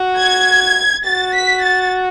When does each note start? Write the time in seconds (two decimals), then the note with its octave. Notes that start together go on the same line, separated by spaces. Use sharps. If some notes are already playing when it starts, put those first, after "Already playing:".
Already playing: F#4
0.17 G#6
1.04 F#4 A6
1.34 B6
1.62 A6